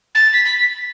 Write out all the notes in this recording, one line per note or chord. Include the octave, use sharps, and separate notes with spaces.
A6
B6
B6